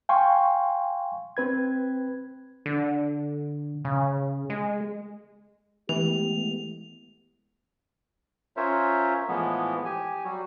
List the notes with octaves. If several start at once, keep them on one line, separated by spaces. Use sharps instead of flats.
F5 G5 G#5 C6 C#6
C4 B4 G#6
D3
C#3
G#3
E3 G#3 A3 B3 G4 F7
C#4 F4 A#4 C5 C#5 E5
A2 E3 F3 G#3 B3
G4 G#5
F#3 G3 F#4